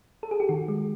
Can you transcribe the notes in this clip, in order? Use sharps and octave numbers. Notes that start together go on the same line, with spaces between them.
A4
G#4
G4
D#3 F#4
G#3